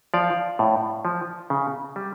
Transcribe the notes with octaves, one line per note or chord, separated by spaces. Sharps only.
F3 D5 F5
A2
F3
C#3
G3